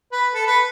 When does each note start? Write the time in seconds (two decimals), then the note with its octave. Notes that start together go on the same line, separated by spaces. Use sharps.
0.12 B4
0.34 A4
0.47 B4